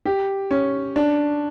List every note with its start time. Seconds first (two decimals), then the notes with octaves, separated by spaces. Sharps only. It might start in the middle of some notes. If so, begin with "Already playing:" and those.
0.05 G4
0.51 C#4
0.96 D4